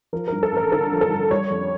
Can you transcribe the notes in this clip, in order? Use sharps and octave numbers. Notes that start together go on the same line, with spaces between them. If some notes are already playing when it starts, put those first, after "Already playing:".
F3 A#4
G2 A#4
A4
A1 A#4
D3 A4
F3
A4
G2
G3 C#5
F2